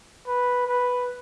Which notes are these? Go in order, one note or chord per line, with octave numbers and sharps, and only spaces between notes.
B4
B4